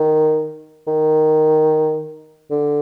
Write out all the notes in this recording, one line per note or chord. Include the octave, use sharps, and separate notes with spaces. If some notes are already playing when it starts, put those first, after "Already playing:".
Already playing: D#3
D#3
D3